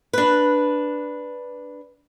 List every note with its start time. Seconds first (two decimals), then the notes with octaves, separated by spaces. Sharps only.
0.13 D4 B4